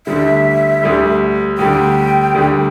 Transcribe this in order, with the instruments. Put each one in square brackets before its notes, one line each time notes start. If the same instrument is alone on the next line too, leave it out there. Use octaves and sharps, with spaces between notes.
[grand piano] D2 D3 G3 [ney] E5
[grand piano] D2 D3 G3
[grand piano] D2 D3 G3 [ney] G5
[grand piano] D2 D3 G3